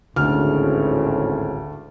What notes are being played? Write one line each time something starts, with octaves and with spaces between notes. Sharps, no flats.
G#1 D2 A2 C#3 F6